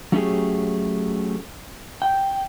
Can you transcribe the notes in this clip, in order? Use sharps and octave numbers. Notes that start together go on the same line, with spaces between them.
F#3 A3 C#4 E4 G4 G#4
G5